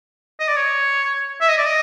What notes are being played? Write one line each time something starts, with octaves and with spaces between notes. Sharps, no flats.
D#5
D5
C#5
E5
D#5
D5
D#5